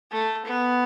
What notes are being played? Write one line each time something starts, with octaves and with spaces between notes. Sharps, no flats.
A3
B3